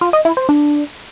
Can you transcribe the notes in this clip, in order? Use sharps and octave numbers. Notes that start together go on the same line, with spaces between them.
F4
D#5
E4
C5
D4